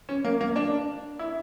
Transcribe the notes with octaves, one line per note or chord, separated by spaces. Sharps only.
C#4
A#3
A#3
D4
E4